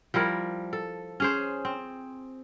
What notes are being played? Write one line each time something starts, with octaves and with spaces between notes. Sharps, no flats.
F3 G3 E4 A#4
A4
C#4 G#4 C5
C4